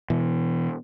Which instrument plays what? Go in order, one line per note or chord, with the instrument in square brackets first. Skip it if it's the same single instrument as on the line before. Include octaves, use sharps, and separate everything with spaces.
[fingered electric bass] B2 E3